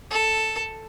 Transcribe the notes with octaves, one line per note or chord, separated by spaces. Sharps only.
A4